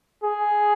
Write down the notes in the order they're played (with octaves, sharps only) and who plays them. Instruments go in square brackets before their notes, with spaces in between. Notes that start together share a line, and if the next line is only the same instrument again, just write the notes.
[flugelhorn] G#4